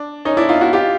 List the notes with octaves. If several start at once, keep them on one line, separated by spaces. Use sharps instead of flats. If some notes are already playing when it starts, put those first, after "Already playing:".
Already playing: D4
C#4 D#4
D4 E4
D#4 F4
E4 F#4
F4 G4